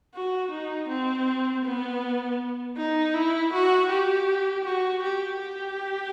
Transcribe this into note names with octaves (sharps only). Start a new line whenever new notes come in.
F#4
D#4
C4
B3
D#4
E4
F#4
G4
F#4
G4
G4